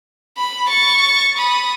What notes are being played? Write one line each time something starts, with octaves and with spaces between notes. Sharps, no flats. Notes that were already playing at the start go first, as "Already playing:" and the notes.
B5
C#6 A6
B5 D#6